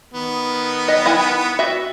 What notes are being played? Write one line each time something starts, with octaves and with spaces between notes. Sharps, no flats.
D#3 B3
D#5
E4 F#5 G#5
F#4 E5